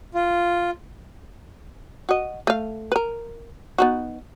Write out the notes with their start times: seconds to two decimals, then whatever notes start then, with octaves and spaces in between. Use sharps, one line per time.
0.14 F4
2.09 F#4 D#5
2.47 A3 F5
2.92 A#4 B4
3.78 B3 D#4 F#4